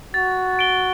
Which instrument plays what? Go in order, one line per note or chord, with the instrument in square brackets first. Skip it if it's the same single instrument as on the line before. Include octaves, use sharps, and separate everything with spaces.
[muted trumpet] F#4 [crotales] A6
[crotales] D7 G7